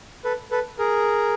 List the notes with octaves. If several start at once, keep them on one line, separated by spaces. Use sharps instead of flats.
A4 B4
A4 B4
G#4 A#4